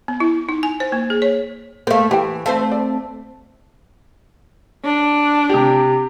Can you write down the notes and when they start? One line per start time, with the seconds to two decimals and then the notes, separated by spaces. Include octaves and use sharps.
0.08 B3
0.20 E4
0.49 D#4
0.63 G#5
0.80 C5
0.92 A#3
1.10 G#4
1.22 C#5
1.87 A3 A#3 C5 F5
2.11 E3 G4 G5
2.46 A3 C4 C5 F5
2.72 D5
4.85 D4
5.49 C3 G4